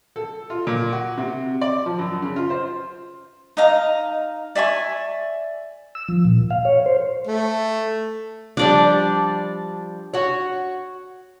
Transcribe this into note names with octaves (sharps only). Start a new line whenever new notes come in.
A4
F4
A#2
F#4
C3
D5
F3
F#2
C#3
F4
C5
D#4 D#5 F5 A#5
D5 E5 G#5 C#6
E6
F3
A#2
F5
C#5
C5
A3
F3 G3 D4 D5
F#4 C#5